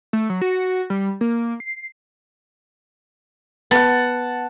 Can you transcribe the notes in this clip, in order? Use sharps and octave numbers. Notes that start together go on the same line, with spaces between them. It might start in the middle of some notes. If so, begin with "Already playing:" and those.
A3
F#3
F#4
G3
A#3
C7
B3 F#5 A5